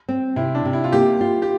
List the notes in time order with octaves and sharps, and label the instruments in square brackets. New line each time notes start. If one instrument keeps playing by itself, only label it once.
[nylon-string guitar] C4
[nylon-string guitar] C3 [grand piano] E4
[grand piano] D4
[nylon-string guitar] C3
[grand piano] E4
F4
[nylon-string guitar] A#3 [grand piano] G4
[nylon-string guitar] F4
[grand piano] G4